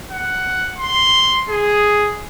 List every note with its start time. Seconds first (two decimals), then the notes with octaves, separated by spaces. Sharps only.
0.11 F#5
0.78 C6
1.49 G#4